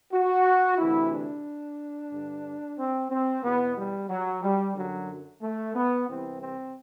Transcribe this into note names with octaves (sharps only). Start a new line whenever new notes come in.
F#4
D2 C3 E3 E4
D4
G2 D3
C4
C4
E2 B2 B3
G3
F#3
G3
F#2 D3 F#3
A3
B3
C2 C3 E3 C4
C4